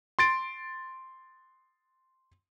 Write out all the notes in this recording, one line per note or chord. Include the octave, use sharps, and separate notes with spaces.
C6 A6 D7